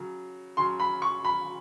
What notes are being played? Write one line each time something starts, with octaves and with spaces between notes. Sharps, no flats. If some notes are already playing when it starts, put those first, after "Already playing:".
Already playing: C#3 F#3
C#3 F#3 C6
B5
C#6
B5